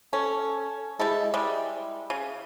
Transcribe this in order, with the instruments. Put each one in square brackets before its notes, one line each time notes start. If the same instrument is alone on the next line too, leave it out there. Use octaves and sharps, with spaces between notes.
[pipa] C#4 [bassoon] A4
[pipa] G3 E4 A4 [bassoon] G#3
[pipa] G3 G#3 [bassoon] E4
[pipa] C#3